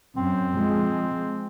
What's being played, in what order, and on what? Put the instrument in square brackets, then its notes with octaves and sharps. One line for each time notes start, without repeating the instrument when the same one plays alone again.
[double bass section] F#2 [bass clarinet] C4
[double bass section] F3 G#3